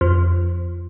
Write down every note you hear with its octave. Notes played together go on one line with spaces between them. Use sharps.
F2